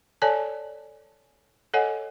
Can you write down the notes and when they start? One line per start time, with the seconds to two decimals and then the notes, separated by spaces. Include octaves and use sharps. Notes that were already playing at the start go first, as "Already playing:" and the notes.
0.22 A4 C#5 D5 G#5 A5
1.74 A4 C#5 D#5 F#5 G#5